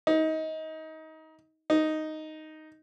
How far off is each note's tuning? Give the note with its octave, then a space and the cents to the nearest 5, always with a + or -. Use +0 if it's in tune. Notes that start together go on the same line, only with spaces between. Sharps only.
D#4 +25
D#4 +0